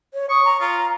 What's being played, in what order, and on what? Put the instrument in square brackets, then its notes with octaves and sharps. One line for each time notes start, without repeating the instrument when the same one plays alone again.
[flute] C#5
[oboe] C#6 [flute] D#6
[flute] A#5
[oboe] F4 [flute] A#5